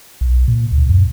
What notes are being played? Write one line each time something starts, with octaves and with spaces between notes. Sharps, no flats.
B1
A#2
D2
F#2